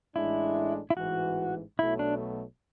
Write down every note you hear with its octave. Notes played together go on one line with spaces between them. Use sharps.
A1 A2 G#3 D4 E4
E4
A1 G#2 E3 F#4
B1 B2 F#3 A3 E4
D4